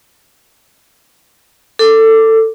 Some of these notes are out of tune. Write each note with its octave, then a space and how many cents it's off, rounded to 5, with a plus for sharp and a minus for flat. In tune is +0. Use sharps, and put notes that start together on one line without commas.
A4 +20 D6 +0